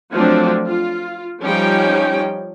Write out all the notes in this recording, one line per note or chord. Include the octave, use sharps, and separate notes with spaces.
F3 F#3 A3 C4 D4
F4
F3 G3 C#4 D#4 G5